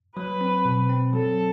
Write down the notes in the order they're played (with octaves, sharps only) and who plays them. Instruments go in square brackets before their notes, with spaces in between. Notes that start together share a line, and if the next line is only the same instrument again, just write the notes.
[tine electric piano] F#3 [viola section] B4
[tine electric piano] C4
B2
C4
[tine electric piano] F#3 [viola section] A4